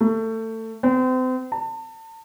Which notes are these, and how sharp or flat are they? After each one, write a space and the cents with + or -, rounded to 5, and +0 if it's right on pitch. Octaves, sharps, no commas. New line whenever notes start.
A3 +25
C4 -35
A5 +35